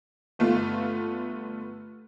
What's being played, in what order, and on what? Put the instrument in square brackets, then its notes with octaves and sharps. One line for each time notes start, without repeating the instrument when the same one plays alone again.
[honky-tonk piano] G1 A3 B3 F4